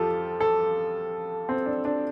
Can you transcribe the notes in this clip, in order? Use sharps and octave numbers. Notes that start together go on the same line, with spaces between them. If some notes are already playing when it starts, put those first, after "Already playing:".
Already playing: F2 F3 F4 G4 A4
A4
C4
D4
D4